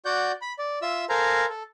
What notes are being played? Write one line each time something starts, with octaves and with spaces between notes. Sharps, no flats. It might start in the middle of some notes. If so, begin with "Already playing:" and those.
F#4 D5 F#5 G6
B5
D5
F4 E5 E6
A4 A#4 C5 F5 G#5 A#5
A4